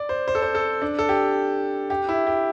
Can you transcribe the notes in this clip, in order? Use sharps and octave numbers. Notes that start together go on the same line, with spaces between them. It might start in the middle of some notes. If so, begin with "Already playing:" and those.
Already playing: D5
C5
C5
A4
C5
A4
D4
A4
G4
G4
E4
G4